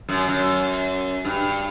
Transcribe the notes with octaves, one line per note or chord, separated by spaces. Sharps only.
F#2
F#2
G2